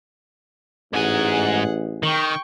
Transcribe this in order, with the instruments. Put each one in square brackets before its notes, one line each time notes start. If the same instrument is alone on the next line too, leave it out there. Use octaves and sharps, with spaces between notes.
[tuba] A1 [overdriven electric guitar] G#2 G#5 [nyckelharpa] G#4 F#5
[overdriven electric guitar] D#3 [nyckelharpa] G5 C#6